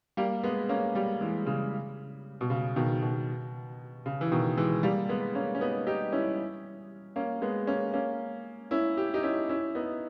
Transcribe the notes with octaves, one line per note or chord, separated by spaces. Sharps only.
G3 A#3
G#3 B3
A#3 C#4
G3 A#3
E3 G#3
C#3
B2
C#3
B2 D#3
B2
C#3
E3
B2 D#3
E3 G#3
G3 A#3
G#3 B3
A#3 C#4
C#4
B3 D#4
D#4 G4
C#4 E4
A#3 C#4
G#3 B3
A#3 C#4
A#3 C#4
C#4 E4
G4
D#4 G4
C#4 E4
C#4 E4
B3 D#4